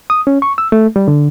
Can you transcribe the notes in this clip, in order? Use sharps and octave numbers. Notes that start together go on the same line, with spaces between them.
D#6
C#4
C#6
E6
A3
G3
D3